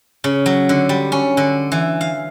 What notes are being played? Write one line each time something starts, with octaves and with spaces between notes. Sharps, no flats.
C#3
F#3
D3
G3
C#4
D3
E3
F5